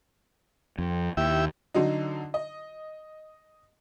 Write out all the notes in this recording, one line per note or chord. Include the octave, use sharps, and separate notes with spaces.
F2
D#2 E4 G4 E5
D3 F#3 D#4
D#5